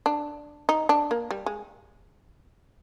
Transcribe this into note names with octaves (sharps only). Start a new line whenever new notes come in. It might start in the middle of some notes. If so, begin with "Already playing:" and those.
D4
D#4
D4
A#3
G3
G#3